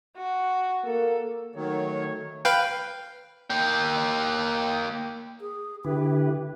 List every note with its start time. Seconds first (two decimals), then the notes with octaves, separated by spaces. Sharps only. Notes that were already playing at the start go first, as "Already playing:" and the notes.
0.17 F#4
0.85 A#3 A4
1.56 D#3 F#3 A3 C#5
2.45 B4 F5 G5
3.50 A#3 G5
5.41 G#4
5.85 D3 E4 G4 B4